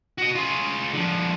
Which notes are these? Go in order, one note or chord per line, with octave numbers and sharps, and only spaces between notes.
F#4 D#5
F4 G#4
D3 F3